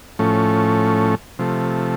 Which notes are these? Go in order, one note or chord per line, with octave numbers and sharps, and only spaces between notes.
A2 F3 A3 C#4
C3 F3 A3